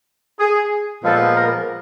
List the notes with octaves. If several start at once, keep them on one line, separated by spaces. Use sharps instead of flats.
G#4
A#2 F3 G#3 B3 A4
A#4